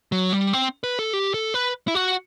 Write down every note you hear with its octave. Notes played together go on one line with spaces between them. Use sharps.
F#3
G3
C4
B4
A4
G4
A4
B4
E4
F#4